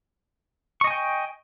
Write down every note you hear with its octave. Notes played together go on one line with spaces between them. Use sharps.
D#5 G5 G#5 C#6